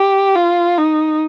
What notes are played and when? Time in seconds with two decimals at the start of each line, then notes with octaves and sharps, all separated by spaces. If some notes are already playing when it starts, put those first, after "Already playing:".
Already playing: G4
0.36 F4
0.78 D#4